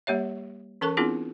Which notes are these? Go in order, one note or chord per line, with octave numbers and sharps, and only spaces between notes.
G3 A#3 G4 C#5 E5
E3 C#4 A4 A#4 A5 C#6
B3 C4 D4 E4 F4 G#4